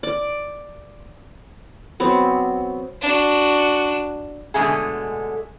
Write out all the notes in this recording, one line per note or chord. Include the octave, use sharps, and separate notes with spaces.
D5
F#3 B3 C4
D4 F#4
B2 D3 G#3 A3 G#4